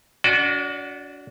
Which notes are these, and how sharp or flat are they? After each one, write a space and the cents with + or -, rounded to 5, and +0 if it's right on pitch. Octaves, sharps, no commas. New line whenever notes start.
D4 -40 F#4 +0 D5 +25